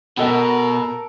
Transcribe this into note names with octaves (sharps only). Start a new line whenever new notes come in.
B2 A4 A#4 D#5 F#5 G#5 E6